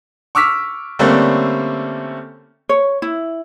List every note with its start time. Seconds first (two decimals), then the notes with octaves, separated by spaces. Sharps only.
0.35 C#6 D6 E6 F6 B6
0.99 D3 G3 A3 A#3 C4 C#4
2.69 C#5
3.02 E4